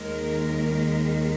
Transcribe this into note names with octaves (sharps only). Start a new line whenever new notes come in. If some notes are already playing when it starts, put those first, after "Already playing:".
Already playing: D#2 D#3 G#3 A#4